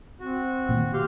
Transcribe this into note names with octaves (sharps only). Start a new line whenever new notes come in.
C4 F#4
A#2 D#3 A#3
G4 F5 C6